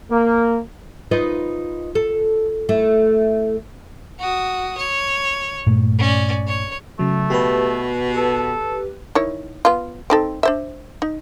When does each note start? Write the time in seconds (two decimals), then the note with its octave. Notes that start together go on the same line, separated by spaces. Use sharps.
0.11 A#3
1.11 D#4 F4 B4
1.95 A4
2.69 A3 E4
4.19 F#4 D#6
4.77 C#5
5.66 G2 A#2 A3
5.99 C#4 D5
6.47 C#5
6.99 C#3 F#3 A3
7.30 B2 G4 B4
8.17 A4
9.15 D#3 E4 C#5
9.65 B3 F4
10.10 C4 D#4 A4
10.43 D4 C5 E5
11.02 D#4